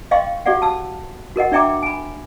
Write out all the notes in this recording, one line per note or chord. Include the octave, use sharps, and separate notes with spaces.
D#5 F5 G5 C6 C#6
F#4 G4 A4 D5 F5 F#5
A5 E6
F#4 A#4 D#5 F#5
D4 D5 E5 G5 A#5 D6
G#5 B5